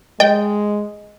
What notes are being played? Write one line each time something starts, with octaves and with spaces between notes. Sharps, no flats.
G#3 D#5 G5